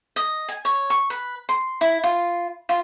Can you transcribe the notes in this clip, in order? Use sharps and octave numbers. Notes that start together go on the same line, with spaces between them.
D#5
G#5
C#5
C#6
B4
C6
E4
F4
F4